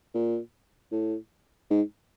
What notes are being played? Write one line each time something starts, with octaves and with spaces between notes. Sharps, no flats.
A#2
A2
G#2